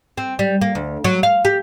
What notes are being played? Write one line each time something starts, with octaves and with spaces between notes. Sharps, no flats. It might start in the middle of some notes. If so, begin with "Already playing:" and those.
C4
G3
A#3
D2
F#3
F5
G4